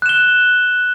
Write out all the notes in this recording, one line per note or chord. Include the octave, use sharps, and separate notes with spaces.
F#6 E7 G7